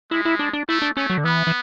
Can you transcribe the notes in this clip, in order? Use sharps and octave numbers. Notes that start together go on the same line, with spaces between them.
G#3 E4
E4
D4
D4
A3 E4
D4
A3 C#4
F#3
D3
E3 B3
E3